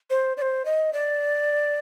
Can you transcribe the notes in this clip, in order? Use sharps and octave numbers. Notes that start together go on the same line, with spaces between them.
C5
D5
C5
D#5
D5